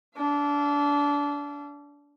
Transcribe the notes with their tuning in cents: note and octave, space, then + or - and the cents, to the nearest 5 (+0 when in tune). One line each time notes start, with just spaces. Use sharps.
D4 -25 F5 -45